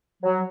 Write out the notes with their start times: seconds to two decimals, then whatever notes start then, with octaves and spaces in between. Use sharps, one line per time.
0.23 F#3